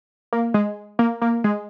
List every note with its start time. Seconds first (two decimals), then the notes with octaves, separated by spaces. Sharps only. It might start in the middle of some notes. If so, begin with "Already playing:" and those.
0.33 A#3
0.54 G#3
0.99 A#3
1.22 A#3
1.44 G#3